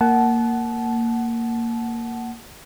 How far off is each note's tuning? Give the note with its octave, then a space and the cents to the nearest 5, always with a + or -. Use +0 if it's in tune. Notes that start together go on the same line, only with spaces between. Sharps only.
A#3 -10 F#5 +15 A5 -25